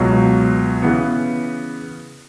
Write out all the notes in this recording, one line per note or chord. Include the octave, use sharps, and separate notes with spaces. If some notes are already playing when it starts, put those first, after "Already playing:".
Already playing: C#2 B2 F#3
C#3 E3 B3